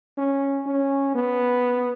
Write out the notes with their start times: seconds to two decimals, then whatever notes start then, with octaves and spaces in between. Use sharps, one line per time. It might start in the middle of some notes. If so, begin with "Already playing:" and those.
0.18 C#4
0.66 C#4
1.15 B3